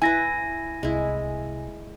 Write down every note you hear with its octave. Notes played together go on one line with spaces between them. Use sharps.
E4 B4 G#5 A#6
C2 G#3 E4